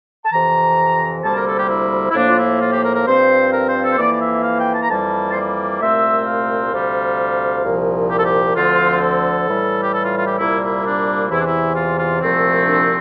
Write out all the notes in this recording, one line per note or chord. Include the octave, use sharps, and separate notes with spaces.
A5
F2 C3 E3 A#5
D2 C3 G3 A#3 A5
A#4
A4
G4
E4
E4
A2 F3 A#3 D4
F4
E4
F4
G4
A#4
A#4
G2 F3 C4 C5
A#4
C5
A4
C5
F2 E3 A#3 D5
D5
E5
F5
G5
A5
A#5
F2 E3 G3 A#3 A5
C5
D5
C2 A#2 A3 C4 E5
F5
D2 C3 G3
C2 A#2 F3
G4
A4
G4
D2 D3 F3 C4 F4
A4
A2 E3 G3
G4
A4
F4
F4
G4
C2 A#2 G3 A#3 E4
E4
D4
E2 C3 E3 E4
D4
E4
F4
F4
C2 A#2 F3 A3 C4
D4